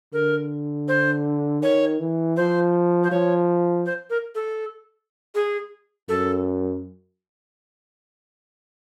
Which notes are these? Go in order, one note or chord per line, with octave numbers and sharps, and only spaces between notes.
D3 A#4
C5
D#3 C#5
E3
F3 C5
C5
F3 C#5
C5
A#4
A4
G#4
F#2 A4